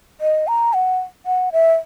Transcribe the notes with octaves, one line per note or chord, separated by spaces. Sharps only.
D#5
A#5
F#5
F#5
E5